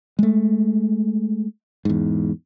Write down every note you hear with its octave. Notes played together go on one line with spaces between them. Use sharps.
G#3 A3
E2 G#2